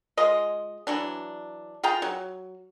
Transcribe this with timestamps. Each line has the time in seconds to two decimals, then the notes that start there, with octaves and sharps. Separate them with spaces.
0.17 G#3 F4 D#5
0.87 E3 F#3 D4
1.83 F4 G#4 G5 A#5
2.02 F#3